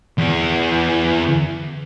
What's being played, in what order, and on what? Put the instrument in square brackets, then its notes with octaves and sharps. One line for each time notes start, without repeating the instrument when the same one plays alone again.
[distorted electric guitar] E2 G#4